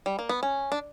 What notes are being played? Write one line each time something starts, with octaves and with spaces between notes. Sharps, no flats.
G3
A#3
B3
C#4
D4